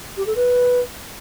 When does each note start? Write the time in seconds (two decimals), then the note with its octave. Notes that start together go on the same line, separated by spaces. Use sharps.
0.17 G4
0.26 A4
0.36 B4